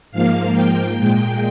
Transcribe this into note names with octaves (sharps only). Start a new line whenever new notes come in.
G#2 F3 A#3 F5
G5
A#2 G#3